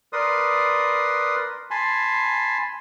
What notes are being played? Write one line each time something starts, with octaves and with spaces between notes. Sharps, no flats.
A#4 B4 D5 C6 D#6
G#5 A5 B5 C6